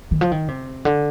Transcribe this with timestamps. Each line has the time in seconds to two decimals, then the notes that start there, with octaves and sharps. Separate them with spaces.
0.11 D#3
0.21 F3
0.32 D#3
0.48 C3
0.85 D3